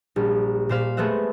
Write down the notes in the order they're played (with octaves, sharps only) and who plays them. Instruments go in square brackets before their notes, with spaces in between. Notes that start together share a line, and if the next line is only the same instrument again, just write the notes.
[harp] A#1 G3
A#2 C5 F5 B6
G#3 A3 B3 C4 E5 F#5